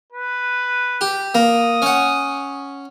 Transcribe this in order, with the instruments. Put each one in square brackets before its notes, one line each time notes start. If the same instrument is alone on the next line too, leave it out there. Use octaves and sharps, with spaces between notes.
[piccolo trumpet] B4
[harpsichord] G4
[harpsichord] A#3 [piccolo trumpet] D#6
[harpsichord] C#4 F#5